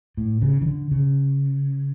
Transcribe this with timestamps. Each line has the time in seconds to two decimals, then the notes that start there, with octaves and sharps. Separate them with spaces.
0.17 A2
0.42 C#3
0.62 E3
0.66 D3
0.91 C#3